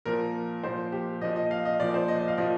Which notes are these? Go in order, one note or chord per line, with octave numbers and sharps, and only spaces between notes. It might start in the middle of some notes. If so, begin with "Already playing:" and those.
A#2 F3 A#4
A#2 F3 C5
G4
A#2 F3 D#5
D#5
F5
D#5
A#2 F3 D5
C5
D#5
D#5
F5
A#2 F3 D#5